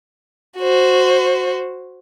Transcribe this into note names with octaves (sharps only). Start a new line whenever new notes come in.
F#4 C5